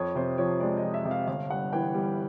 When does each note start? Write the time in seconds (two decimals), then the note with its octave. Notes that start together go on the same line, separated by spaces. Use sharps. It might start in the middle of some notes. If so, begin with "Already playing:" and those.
Already playing: F2 C#5
0.15 C3 C5
0.38 F3 C#5
0.60 G#3 D5
0.77 D#5
0.83 F2
0.94 E5
1.05 C3
1.11 F5
1.27 G1 F5
1.50 G2 F#5
1.73 E3 G5
1.94 G3